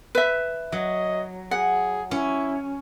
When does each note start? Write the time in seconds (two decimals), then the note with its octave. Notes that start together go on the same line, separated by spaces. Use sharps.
0.15 B4 E5
0.72 F#3 D#5
1.51 G#4 F#5
2.11 C#4 E4